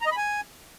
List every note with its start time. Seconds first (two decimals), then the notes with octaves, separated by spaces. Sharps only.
0.01 A#5
0.06 D#5
0.12 B5
0.17 G#5